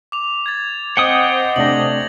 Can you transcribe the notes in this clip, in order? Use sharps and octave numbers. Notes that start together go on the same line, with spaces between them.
D6 F7
G#6 A6
C4 C5 D#5 F#5 G5 D#6
C3 A3 D4 A#6 F#7